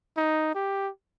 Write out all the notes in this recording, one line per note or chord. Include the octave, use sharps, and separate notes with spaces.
D#4
G4